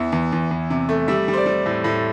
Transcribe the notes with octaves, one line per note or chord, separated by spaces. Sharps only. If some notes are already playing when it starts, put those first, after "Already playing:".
Already playing: E2 E3 E5
E2
E2
E2
C3
A3
G3 E5
G3
C5
D5
G3
A2
A2